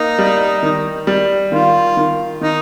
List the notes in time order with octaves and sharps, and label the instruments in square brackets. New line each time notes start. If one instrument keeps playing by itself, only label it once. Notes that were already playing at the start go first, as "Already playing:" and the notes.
Already playing: [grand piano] A#3 [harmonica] D#4
[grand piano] G3
D#3
G3
[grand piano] D#3 [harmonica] F4
[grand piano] D#3
[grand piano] D#3 [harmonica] D#4